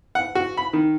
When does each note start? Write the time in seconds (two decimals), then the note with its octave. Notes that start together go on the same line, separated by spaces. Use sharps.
0.15 F#5
0.35 F#4
0.57 B5
0.73 D#3